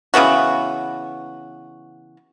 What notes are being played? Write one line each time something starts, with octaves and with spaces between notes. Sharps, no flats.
C#3 E3 B3 F#4